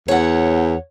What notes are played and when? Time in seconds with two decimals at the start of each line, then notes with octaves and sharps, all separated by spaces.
0.08 E2 C#5 F#5